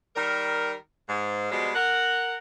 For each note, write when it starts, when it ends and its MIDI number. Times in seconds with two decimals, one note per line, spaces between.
0.16 0.73 51
0.16 0.73 55
0.16 0.73 70
1.09 1.49 44
1.52 1.69 47
1.52 1.69 53
1.52 1.69 55
1.52 1.69 56
1.75 2.35 70
1.75 2.35 78